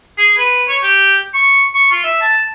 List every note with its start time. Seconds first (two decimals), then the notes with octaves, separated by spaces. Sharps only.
0.18 G#4
0.38 B4
0.69 C#5
0.83 G4
1.34 C#6
1.75 C#6
1.92 F4
2.04 E5
2.21 A5